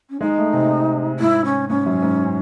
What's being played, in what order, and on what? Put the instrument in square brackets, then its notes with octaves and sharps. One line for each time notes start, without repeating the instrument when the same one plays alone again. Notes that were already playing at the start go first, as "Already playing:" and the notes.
[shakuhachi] C#4
[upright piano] G#3 [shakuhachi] D#4
[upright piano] A3
C3
[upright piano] G#2 [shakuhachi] E4
[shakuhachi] C#4
[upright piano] G#2 [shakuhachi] C#4
[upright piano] F#2
G#2